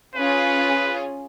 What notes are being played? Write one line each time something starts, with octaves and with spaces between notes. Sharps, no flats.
C#4 F4 G#4 B4